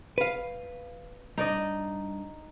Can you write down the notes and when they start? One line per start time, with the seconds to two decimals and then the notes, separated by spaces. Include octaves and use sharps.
0.18 B4 F5
1.38 G3 D4 D#4 D5 D#5